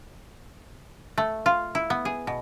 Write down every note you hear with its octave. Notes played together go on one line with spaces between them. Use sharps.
A3
F4
E4
B3
G#4
B2